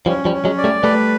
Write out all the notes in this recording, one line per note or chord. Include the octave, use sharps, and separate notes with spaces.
F3 G3 C#4
F3 G3
C#4
F#3 G#3
D5
G3 A3
G3 A3 B4